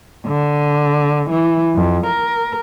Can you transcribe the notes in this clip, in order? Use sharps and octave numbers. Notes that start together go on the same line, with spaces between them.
D3
E3
F2
A#4